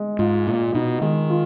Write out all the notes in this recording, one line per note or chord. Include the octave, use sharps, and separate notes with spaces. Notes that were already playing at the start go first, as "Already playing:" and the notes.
Already playing: G#3
G#2 F4
A#2 F4
B2 D#4
D#3 G#3
F4